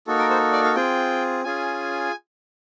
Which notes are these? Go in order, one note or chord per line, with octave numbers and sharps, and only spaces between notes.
A#3 D#4 F#4 A4
A#4
C5
D5
F5
C4 F4 G#4 G5
C#4 F4 G#4 G#5